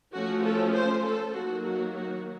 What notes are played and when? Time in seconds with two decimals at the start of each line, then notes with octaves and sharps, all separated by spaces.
0.13 F3 A3 C#4 F#4
0.44 A4
0.74 C5
1.03 A4
1.34 D#3 F#3 A#3 F#4
1.64 F#4
1.95 F#4